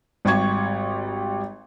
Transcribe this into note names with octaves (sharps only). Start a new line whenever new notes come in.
G#1 G3 G4 C#6 G#6